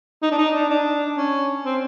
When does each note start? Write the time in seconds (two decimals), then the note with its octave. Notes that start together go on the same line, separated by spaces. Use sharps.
0.23 D#4
0.31 D4
0.38 D#4
0.55 D4
0.70 D4
1.17 C#4
1.65 C4